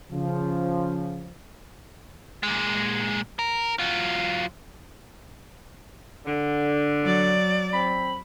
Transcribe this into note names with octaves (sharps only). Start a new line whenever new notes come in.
C#3 F3
A#2 G#3
A#4
F#3 F4
D3
F#3 D5
C4 B5